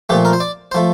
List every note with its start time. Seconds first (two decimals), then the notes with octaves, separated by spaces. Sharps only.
0.09 A#2 F3 A3 G4
0.25 A#4
0.33 C5
0.40 D5
0.72 C5
0.75 F3 A3